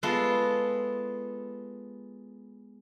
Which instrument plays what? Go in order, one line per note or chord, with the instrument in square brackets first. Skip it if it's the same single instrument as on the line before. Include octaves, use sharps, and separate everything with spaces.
[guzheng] G#3 B3 F4 A4